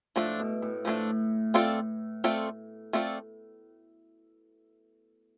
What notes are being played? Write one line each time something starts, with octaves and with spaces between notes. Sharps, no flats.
A2 F3 A3 D4
B2
A2
A2 F3 A3 D4
A3 C4 F4 A4 D5
A3 C4 F4 A4 D5
A3 C4 F4 A4 D5